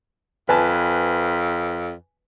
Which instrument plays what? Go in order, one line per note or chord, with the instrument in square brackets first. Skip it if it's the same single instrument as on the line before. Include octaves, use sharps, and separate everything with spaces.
[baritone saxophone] F2 [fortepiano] B4 G#5 A5